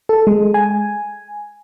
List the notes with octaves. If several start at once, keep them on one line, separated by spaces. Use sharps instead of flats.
A4
G#3
G#5